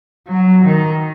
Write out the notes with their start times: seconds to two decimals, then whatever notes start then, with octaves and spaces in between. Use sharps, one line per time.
0.29 F#3
0.63 D#3